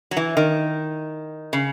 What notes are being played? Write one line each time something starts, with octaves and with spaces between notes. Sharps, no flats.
F#3
E3
D#3
C#3